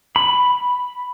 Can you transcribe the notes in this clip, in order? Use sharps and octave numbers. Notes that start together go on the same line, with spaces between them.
B5